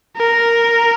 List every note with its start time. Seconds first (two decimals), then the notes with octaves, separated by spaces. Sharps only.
0.17 A#4